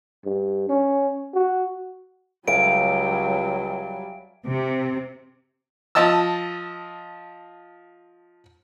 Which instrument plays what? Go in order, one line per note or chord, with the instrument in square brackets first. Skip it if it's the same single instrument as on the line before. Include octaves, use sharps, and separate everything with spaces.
[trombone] G2
C#4
F#4
[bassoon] C#2 [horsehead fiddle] F#3 G3 [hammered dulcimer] E5 F5 G#5 [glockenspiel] D7
[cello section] C3
[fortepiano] F3 D#5 A5 E6